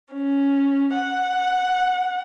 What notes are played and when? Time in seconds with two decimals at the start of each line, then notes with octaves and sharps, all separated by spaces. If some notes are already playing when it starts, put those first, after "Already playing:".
0.12 C#4
0.94 F#5